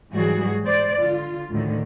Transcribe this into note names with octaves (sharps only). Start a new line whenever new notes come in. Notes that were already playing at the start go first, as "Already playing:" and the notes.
G#2 E3 F#3 G3 F#4 G#4
C5 D5
D3 F4
D2 A2 D3 D#3